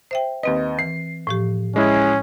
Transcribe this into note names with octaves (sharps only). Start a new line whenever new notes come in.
C5 E5 G5
D#2 C4 B4 D#5
E3 C7
A2 F3 G4
G#3 C#4 E4 G#4